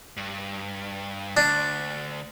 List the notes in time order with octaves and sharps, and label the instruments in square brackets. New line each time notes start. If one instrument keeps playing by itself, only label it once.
[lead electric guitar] G2
[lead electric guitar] D2 [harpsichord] D4